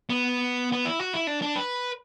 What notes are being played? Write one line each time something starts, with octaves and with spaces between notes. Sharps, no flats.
B3
B3
E4
F#4
E4
D4
D4
B4